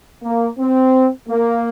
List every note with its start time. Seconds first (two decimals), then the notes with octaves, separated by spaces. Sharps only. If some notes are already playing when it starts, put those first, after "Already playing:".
0.23 A#3
0.59 C4
1.29 A#3